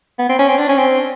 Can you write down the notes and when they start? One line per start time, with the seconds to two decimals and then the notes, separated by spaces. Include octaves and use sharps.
0.19 B3
0.29 C4
0.39 C#4
0.49 C4
0.58 D4
0.69 C#4
0.78 C4